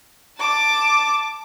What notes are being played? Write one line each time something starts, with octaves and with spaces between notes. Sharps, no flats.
A5 D6